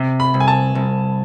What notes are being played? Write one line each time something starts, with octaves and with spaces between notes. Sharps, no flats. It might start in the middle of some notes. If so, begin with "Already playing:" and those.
Already playing: C3
B5
C2
G#5
A5
C2